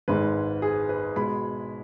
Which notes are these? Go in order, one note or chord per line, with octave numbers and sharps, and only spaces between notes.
G#1 G#2 G#3 B4
G#4
B4
B2 G#3 B5